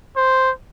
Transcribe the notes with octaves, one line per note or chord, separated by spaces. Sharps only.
C5